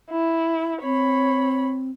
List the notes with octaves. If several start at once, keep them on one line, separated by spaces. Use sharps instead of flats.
E4
C4 C#5 B5